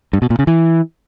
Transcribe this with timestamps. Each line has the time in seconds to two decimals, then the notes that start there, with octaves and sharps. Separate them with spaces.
0.13 G2
0.22 B2
0.30 A#2
0.39 C#3
0.47 E3